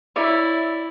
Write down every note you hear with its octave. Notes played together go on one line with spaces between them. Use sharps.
E4 C#5 D5 E5